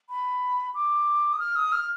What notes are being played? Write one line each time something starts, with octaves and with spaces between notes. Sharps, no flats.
B5
D6
D#6
F6
D#6
F6